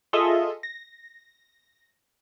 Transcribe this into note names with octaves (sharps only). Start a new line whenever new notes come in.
F4 G#4 A4 D#5 E5
A#6